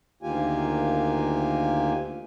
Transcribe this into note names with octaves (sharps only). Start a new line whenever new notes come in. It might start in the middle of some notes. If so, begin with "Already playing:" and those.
D2 D#3 A#3 F4 G4 G#5